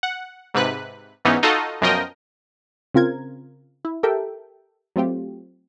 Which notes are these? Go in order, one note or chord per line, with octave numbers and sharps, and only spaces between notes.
F#5
G#2 C3 B4 F#6
G#2 E3 B3 C#4 D#4
D#4 F4 F#4 A4 D#5
F#2 B2 F3 A#4 D#5 G5
C#3 C4 F4 A#4 G#6
E4
G4 A4 A#4 E5 G5
F#3 A3 C4 F4 G4